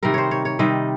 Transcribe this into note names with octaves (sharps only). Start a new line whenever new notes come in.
C3 D#3 G3 A#4
C5 C#5
C#5
C#5
C3 D#3 G3 D#5